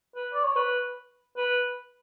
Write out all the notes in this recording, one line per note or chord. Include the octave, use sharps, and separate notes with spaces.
B4
D5
C#5
B4
B4